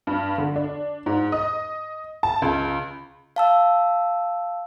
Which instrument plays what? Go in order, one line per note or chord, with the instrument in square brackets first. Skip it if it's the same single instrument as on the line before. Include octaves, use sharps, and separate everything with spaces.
[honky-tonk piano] G2
D3
D4
G#2
D#5
A5
C#2
[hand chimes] F5 A5 E6